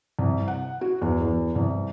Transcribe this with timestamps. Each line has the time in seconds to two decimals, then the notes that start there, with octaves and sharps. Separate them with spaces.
0.19 C2
0.48 F#5
0.81 F#4
1.01 E2
1.21 E2
1.55 C2